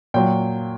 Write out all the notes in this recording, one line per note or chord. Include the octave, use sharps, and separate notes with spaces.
A#2 F#3 G5